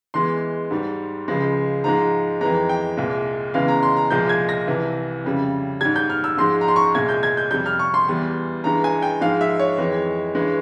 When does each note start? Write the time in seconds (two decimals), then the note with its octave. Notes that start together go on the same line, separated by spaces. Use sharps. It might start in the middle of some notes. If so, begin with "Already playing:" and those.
0.14 E2 E3 G#3 C6
0.71 G#2 G3
1.28 C#2 C#3 F3 G#3
1.84 G#2 F3 G#3 A#5
2.41 F2 E3 G#3 A#5
2.69 G5
2.97 C2 A#2 G#3
3.54 E2 C#3 E3 G#3 F5
3.68 A#5
3.83 C6
3.97 A#5
4.11 C2 A#2 F3 G#3 G6
4.29 G#6
4.49 A#6
4.67 C2 C3 E3
5.24 F2 C#3 G3
5.81 G#2 G3 G#6
5.96 G6
6.10 F6
6.24 E6
6.37 G#2 F3 G#3 C6
6.61 A#5
6.68 C6
6.76 C#6
6.94 C2 A#2 G#3 G#6
7.09 G6
7.23 G#6
7.37 G6
7.51 F2 C3 G3 G6
7.66 F6
7.79 C#6
7.94 C6
8.08 E2 E3 G3
8.64 G2 E3 G#3 A#5
8.84 G#5
9.02 G5
9.21 G#2 F3 G#3 F5
9.41 E5
9.59 C#5
9.78 F2 E3 G#3
10.35 G2 E3 G#3